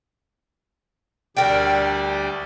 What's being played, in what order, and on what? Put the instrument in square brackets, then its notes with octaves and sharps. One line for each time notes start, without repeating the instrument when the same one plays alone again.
[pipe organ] D2 G3 D5 [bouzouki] D4 A#4 G5